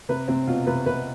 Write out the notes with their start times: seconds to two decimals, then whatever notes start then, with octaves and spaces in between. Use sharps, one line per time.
0.09 C3 B4
0.28 C3 C4
0.47 B2 F4
0.67 C3 B4
0.86 C3 B4